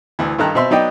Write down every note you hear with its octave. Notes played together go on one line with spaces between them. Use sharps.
D2 E3
G2 D#3 A4 A#5 F#6
B2 C4 E5 C6
F#3 B3 D#4 D5 D#5 G5